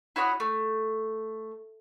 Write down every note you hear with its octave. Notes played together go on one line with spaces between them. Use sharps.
E4 F#4 C#5 D#6
A3